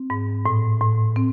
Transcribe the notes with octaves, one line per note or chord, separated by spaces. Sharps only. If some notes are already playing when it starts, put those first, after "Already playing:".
Already playing: C4
G#2
A2
A2
C4